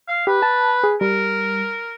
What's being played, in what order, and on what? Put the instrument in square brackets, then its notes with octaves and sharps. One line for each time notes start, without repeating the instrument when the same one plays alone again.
[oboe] F5
[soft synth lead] G4 [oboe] B4
[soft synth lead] A5
G#4
[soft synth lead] G3 [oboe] A#4